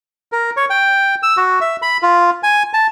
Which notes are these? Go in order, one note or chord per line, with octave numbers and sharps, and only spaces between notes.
A#4
C#5
G5
E6
F#4
E5
B5
F4
G#5
A5